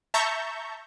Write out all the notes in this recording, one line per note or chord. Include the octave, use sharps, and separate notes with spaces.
E5 A5 A#5 C#6 G6